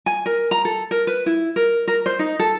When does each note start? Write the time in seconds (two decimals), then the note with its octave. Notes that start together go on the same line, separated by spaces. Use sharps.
0.06 G#5
0.26 A#4
0.51 A#5
0.65 A4
0.91 A#4
1.07 B4
1.26 E4
1.56 A#4
1.88 A#4
2.06 C5
2.19 D#4
2.39 A4